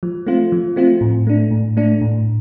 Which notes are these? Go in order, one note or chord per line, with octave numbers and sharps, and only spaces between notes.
F3
A3 C4 F4
F3
A3 C4 F4
A2
A3 D4
A2
A3 D4
A2